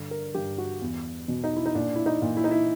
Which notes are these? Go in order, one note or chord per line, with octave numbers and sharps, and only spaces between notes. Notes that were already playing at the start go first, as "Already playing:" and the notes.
Already playing: G2 D3
A#4
G2 G4
F#4
E2
B2
D#4
E4
D#4
A#2 D4
E4
D#4
A#2
E4
D#4
E4